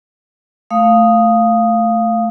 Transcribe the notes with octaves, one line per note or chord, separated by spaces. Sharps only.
A3 F5 D#6